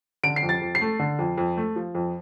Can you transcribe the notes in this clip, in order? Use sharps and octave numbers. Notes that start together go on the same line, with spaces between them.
D3 D7
C7
F2
A6
F2
C7
A3
D3
F2
F2
A3
F3
F2